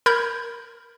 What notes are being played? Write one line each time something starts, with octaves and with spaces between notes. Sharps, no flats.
A#4 B5 G6 G#6